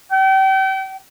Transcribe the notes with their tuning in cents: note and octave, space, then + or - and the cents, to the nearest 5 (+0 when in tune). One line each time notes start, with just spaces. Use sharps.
G5 -35